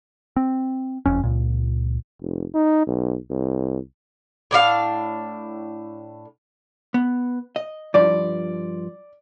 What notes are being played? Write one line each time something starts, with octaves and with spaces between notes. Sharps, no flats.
C4
F#1 F2 C#4
C#2 A#2
F1
D#4
B1
C2
A2 D4 G4 F5
B3
D#5
G2 F3 D5